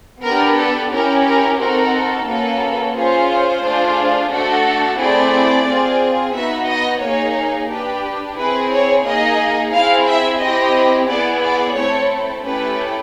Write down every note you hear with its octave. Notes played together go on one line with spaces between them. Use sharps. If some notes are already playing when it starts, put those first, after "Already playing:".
B3 D4 G4 A#4
A4
C#4 E4 G4 A#4
A#4
C4 D#4 F#4 A4 A#4
A#3 C#4 F#4 A4 B4
C#4 F4 G#4 C5
A3 D4 F4 G#4
A3 D4 F#4 A4
A3 C4 E4 G#4 D5
C4 F4 G#4
B3 D#4 F#4 E5
D#5
A#3 D#4 G#4 C#5
D4 G4 B4
C4 E4 G#4 B4
C#5
A#3 D#4 G#4 D#5
C4 E4 G#4 F5
E5
C4 E4 G4 D#5
B3 E4 G#4 D5
D5
A3 C4 E4 A4 C#5
A3 C#4 E4 G4 B4